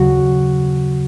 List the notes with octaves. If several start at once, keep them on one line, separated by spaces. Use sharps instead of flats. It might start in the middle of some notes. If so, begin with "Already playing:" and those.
Already playing: D#2 C#3 F#3 F#4